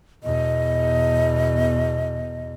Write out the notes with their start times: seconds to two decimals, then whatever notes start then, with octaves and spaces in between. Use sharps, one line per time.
0.24 E2 B2 D#5